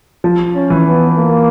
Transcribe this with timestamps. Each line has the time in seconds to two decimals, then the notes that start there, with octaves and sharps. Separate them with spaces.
0.24 F3
0.55 C#4
0.70 E3
0.86 B3
1.18 A#3